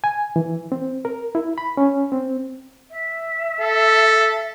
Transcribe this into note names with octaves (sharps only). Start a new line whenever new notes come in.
G#5
E3
C4
A#4
E4
B5
C#4
C4
E5
A4